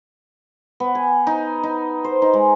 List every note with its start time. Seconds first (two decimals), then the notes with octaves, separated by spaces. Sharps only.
0.80 B3
0.95 G#5
1.27 D#4
1.63 D#4
2.04 C5
2.22 D#4
2.33 G#3